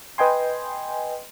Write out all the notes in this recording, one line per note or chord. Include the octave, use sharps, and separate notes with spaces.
B4 D#5 G5 G#5 C6